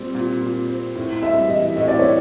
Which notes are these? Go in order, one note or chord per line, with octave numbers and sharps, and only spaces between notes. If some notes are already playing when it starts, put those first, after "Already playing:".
Already playing: A#2 G3 C4
A#2
A#2
C4
A2
G3 E5
E3 D#5
A2 D#5
D5
A2 C#5